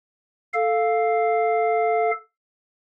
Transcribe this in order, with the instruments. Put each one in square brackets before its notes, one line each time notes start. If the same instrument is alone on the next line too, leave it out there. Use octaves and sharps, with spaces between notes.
[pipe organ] A4 F5